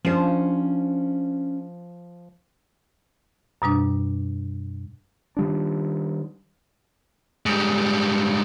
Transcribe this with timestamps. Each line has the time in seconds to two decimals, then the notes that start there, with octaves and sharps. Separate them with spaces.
0.05 F3 C#4 D4 C5
3.62 F#2 B2 G3 D4
5.37 D#3 G3 D4
7.46 G#2 G3